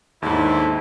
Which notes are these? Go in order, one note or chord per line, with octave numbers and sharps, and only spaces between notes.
D#2 G#2 A3 D4 E4